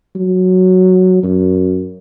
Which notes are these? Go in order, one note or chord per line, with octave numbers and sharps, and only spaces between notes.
F#3
F#2